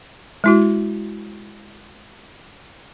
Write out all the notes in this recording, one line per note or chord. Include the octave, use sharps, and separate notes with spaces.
G#3 E4 F#4